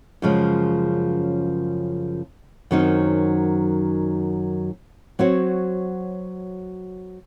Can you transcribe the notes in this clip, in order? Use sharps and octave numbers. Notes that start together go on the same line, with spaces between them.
F#2 C#3 F3 G#3
F#2 D#3 F#3 C4 D#4
F#3 C4 F#4 C#5